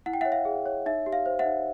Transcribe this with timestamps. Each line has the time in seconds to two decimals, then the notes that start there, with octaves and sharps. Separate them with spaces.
0.06 E4 F#5
0.14 G5
0.21 C#5 E5 F#5
0.32 F5
0.45 G#4
0.66 C#5
0.86 D#4 E5
1.06 G4
1.13 F5
1.26 C5
1.39 E5 F#5
1.45 D#4